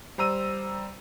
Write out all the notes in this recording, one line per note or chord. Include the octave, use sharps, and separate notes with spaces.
G3 C5 A#5 E6 D#7